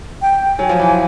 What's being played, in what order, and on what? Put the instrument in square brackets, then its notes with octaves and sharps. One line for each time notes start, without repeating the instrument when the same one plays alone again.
[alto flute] G5
[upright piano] F#3 [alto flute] G#5
[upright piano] F3
E3
F3